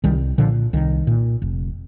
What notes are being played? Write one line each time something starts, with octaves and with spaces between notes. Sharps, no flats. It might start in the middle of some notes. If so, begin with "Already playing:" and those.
C2 D#3 G3
A#2 D3 F3
C2 D#3
A#2
F1